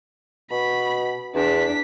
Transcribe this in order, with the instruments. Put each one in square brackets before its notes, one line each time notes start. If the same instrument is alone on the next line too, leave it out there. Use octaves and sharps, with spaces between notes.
[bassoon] B2 [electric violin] B5
[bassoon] E2 [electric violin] D4 B6